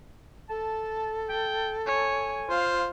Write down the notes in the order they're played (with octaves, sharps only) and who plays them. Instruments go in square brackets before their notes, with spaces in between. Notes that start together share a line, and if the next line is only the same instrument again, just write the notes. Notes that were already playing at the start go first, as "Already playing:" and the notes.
[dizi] A4 [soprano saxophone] A5
[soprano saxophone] G5
[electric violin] C#5 [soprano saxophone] G#5
[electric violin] F4 F5 [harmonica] C5